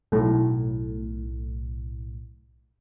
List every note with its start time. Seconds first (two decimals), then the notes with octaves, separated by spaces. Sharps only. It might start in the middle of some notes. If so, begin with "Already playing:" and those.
0.12 B1 A2